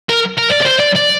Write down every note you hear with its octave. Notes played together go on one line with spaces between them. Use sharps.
A#4
A#4
D5
D5
C5
D5
D5